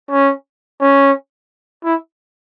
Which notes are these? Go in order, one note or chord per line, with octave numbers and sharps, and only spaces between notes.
C#4
C#4
E4